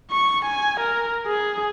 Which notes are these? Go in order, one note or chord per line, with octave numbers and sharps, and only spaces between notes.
C#6
G#5
A#4
G#4